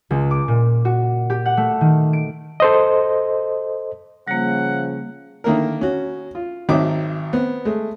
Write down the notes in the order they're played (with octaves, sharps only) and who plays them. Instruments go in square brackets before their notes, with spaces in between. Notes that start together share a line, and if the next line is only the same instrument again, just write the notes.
[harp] C#2
D6
A#2
F#4
G4
F#5
A3
D#3
D7
[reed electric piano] A4 C5 D#5
[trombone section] C#3 F3 [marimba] G3 A#3 [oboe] F#5
[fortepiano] D3 D#3 A#3 E4 A#4
C#4 F#4
F4
G#1 D#3 F#3 E5 D6
B3 C4
G#3 A3